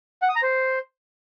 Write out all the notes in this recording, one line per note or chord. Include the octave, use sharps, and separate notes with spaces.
F#5
D#6
A#5
C5